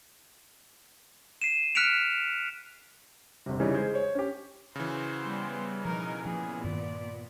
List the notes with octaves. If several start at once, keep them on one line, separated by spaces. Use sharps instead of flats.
C7 D#7 E7
F6 F#6 B6 C#7 D7 F7
G1 C3
C#3 E3 G3 C#4 D#4
G#3 G#4 C5
C5 C#5
C#4 G4
C#3 E3 F#4 C5
G3 B3
B2 F3 D#4 A#4
A#2 F3 B3 G#4
G2 D#3 D5